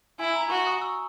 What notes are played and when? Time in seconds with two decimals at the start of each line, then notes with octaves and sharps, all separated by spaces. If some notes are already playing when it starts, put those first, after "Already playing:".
0.19 E4 G#5
0.36 A#5
0.50 F#4 C#6
0.67 D#6
0.82 E6